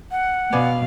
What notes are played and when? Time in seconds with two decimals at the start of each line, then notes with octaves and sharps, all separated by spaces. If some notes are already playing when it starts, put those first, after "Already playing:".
0.11 F#5
0.53 B2 B3 D5 F5 G#5